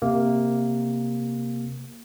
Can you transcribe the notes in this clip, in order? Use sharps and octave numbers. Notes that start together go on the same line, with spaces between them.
C3 A#3